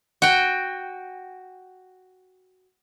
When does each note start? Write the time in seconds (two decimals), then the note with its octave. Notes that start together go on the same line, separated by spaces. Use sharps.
0.22 F#4 G5